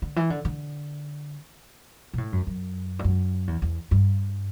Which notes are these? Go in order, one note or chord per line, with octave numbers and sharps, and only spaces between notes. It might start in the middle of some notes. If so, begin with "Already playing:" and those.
D3
E3
D3
D3
B2
A2
F#2
F#2
G2
F#2
E2
E2
G2